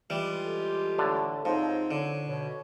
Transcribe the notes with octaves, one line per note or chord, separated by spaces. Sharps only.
E3 G3 G#3 F4 G4
A4
A2 D3 A5
G#2 F3 C4 D#4 C#5
D3 C#5
B2 C#5